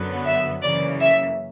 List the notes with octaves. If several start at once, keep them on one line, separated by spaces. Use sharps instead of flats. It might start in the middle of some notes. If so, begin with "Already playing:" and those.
Already playing: F#2 D3 F#3 B3
E5
F#2 C#3 E3 A#3 D5
E5